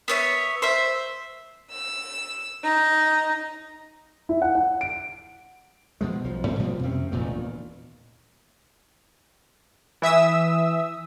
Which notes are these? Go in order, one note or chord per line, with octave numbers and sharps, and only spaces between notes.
B3 C#5 E5
C5 E5
E6
D#4
E4
F#5
F#5
D7
B2 F3 G#3
B1 F3
G#2 C4
B2 F3 G3 A#3
F2 C3 C4 C#4
E1 D2 A#2 D#3
E3 E5 D#6 E6